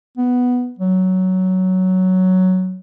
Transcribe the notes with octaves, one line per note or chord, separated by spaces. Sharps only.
B3
F#3